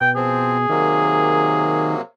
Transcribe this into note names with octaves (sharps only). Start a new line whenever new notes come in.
B2 G5
F3 C4 G#4
C3 D#3 F#3 A#3